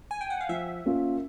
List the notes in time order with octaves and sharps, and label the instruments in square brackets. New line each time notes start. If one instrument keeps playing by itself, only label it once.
[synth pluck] G#5
G5
F#5
F5
[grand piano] F3 [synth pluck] E5
[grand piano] A#3 C#4 F4